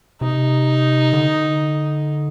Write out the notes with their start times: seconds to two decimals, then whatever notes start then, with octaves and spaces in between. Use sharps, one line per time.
0.21 C3 D#4
1.13 D3